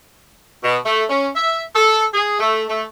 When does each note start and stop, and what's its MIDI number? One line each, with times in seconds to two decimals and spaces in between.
0.64 0.77 47
0.86 1.03 57
1.10 1.28 61
1.36 1.60 76
1.76 2.04 69
2.14 2.36 68
2.40 2.63 57
2.69 2.83 57